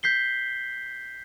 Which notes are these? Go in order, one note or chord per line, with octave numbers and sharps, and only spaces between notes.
G6 B6 C7 G7